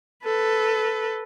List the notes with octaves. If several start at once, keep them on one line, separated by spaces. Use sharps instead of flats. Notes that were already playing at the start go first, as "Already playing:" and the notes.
A4 B4